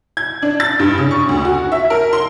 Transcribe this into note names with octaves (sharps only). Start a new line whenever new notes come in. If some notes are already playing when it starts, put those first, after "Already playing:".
G#6
D4
A6
G2
C#3
C#6
D2
F#4
E5
A#4
C6